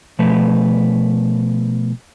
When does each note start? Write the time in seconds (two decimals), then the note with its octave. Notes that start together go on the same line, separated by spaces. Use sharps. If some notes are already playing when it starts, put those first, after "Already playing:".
0.19 B2 F3 A3 B4